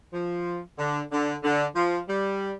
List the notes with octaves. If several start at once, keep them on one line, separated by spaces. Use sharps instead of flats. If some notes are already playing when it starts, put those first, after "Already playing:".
F3
D3
D3
D3
F3
G3